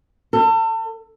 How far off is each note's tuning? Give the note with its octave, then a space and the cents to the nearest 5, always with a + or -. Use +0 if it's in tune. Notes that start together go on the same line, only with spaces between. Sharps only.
A4 +35